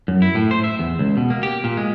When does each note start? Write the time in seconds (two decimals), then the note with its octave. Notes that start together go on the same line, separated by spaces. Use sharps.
0.08 F#2
0.22 E4
0.35 A2
0.51 C5
0.64 E5
0.79 E2
0.99 C#2
1.17 B2
1.30 A#3
1.43 G4
1.64 A#2
1.77 G#3